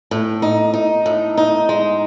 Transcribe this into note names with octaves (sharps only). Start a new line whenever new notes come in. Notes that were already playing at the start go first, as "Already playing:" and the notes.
A2
D#4
D#4
A2
D#4
G#3